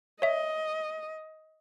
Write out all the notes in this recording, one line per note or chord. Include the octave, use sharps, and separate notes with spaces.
C#5 D#5 E5